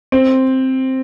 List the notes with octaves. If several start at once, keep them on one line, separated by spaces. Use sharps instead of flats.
C4